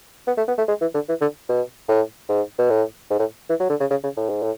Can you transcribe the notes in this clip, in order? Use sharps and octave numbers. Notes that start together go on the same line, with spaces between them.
B3
A3
B3
A3
G#3
E3
D3
E3
D3
B2
A2
G#2
B2
A2
G#2
A2
E3
F#3
D3
C#3
C#3
C#3
A2
G#2
A2